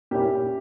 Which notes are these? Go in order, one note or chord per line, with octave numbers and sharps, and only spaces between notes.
A#2 A#3 C#4 E4 G4